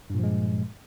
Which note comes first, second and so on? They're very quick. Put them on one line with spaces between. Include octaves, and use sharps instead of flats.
G2 A#2 F3 G#3